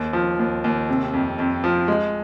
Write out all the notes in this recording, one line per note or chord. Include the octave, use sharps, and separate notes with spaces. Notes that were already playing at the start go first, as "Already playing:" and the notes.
Already playing: D#2
F3
D#2
D#2
C3
F2
F2
F3
G#3